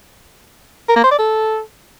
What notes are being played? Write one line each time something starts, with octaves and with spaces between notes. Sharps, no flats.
A#4
A#3
C5
D5
A4